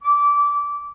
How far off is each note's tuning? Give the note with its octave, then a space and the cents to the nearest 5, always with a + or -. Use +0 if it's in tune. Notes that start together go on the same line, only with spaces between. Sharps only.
D6 -20